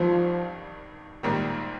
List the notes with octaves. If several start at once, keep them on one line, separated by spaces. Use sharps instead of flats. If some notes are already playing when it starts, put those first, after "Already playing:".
Already playing: G#1 G2 D#3 F3 G3
A#1 G#2 D#3 G3 A#3